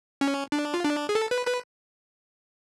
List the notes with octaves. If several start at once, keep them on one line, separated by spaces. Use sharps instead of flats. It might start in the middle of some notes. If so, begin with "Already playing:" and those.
C#4
D4
F4
D4
G#4
A4
B4
B4